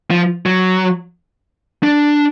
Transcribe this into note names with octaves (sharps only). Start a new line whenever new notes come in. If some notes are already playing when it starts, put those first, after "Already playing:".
F3
F#3
D4